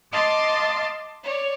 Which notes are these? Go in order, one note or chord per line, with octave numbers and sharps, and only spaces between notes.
D#5 F5 A5 C6 D6
C#5 D5